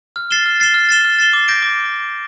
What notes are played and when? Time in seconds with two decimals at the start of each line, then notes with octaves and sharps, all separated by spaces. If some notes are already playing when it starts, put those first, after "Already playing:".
0.16 F6
0.31 A6 C7 E7 G7
0.46 F6
0.60 A6 C7 E7 G7
0.74 F6
0.89 A6 C7 E7 G7
1.05 F6
1.19 A6 C7 E7 G7
1.33 D6
1.48 G6 A#6 D7
1.62 D6